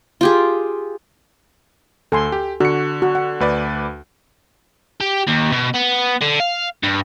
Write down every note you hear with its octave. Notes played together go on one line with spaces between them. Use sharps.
F4 G4 G#4
D2 A4 G#5 C6
G4
D3 F#4 C#7
F#4
F#5
D2 B4 D5
G4
D#2
B2
B3
D3
F5
G2